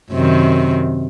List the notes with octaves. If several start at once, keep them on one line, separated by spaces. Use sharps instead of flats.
F#2 C3 D#3